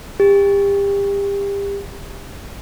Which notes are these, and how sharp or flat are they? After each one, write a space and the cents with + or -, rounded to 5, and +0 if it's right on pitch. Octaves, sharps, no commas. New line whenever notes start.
G4 +30